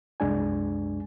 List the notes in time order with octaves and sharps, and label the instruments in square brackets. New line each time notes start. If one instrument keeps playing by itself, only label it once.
[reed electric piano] C2 F#2 G#3 D4 G#5